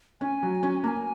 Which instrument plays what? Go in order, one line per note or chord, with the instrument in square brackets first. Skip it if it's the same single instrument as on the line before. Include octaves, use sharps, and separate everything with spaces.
[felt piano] C#4 [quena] G#5
[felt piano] F#3
C#4
[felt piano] A#3 [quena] A#5
[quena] G#5